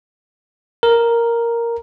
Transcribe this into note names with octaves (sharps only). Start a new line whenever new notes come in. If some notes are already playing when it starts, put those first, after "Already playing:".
A#4